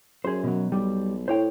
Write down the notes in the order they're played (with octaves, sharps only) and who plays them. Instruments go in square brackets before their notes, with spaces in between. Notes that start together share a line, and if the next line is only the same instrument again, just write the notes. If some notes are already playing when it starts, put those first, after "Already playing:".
[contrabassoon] F#2 [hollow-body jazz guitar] G#4 C5
[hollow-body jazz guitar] B2 F#3
[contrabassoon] B1 [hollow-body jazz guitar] G3
[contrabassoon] A2 [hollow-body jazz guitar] C5 C#5 G5